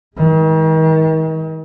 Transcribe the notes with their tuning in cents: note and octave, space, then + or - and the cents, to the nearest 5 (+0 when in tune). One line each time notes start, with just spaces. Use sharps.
D#3 +40 G#3 +0